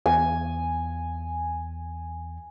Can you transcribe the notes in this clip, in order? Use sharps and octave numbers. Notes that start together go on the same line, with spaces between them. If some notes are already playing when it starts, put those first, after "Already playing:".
E2 G#5